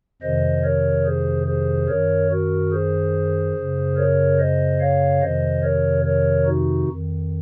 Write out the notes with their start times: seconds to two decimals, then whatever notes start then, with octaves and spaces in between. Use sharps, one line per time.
0.22 F2 C3 D#3 C5 D#5
0.64 A#4 C#5
1.06 G#4 C5
1.47 G#4 C5
1.88 F#2 D#3 A#4 C#5
2.31 F#4 A#4
2.72 G#4 C5
3.56 F#2 C#3
3.96 A#4 C#5
4.38 C5 D#5
4.80 C#5 F5
5.21 F2 C3 D#3 C5 D#5
5.63 A#4 C#5
6.04 A#4 C#5
6.46 D#4 F#4
6.88 F2 D#3